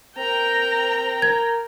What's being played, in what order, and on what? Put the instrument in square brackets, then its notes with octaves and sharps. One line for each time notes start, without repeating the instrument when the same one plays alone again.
[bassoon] C4 [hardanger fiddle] A#4 [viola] G5 A#5
[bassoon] A#4 [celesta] G#6